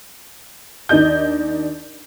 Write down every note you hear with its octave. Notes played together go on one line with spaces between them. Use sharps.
D#2 D4 D#4 D5 D#5 G6